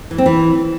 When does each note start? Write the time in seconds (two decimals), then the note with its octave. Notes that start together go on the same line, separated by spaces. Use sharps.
0.11 E3
0.18 C4
0.26 E3